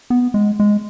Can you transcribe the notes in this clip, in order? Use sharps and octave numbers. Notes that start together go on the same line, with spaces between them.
B3
G#3
G#3